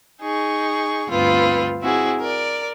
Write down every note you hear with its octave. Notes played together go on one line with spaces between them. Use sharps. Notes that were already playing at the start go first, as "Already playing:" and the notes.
D#4 G#4 C#6
D2 G2 B3 C4 F4
C4 E4 F#4 G#4
A#4 D5